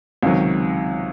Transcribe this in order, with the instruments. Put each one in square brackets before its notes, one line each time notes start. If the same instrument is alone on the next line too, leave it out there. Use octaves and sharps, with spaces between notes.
[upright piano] C#2 C3 D#3 F#3